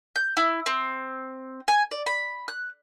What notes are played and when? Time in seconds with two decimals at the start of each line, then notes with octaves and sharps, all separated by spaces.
0.16 G6
0.37 E4
0.66 C4
1.68 G#5
1.91 D5
2.06 B5
2.48 F#6